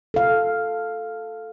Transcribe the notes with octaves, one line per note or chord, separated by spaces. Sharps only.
A4 F5